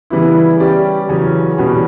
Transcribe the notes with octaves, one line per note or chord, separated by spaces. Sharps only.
C#3 E3 G3 B3 E4
G3 C#4 G4 D5
E2 C#3 F#3 C#4
E2 B2 G3 C#4 F#4